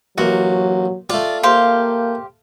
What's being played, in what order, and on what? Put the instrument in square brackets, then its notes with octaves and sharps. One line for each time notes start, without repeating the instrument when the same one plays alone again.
[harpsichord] A1 A#3 [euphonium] F#3 [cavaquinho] F#4
[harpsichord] A3 F4 [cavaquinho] D5
[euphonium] A#3 [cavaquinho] G4 C5 F5